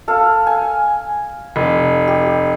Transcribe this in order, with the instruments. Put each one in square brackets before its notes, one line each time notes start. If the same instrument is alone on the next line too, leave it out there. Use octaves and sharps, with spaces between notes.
[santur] A4 F5
G#5
[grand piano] F1
[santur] G4